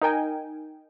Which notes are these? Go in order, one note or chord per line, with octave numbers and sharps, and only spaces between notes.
D#4 A#4 G5 G#5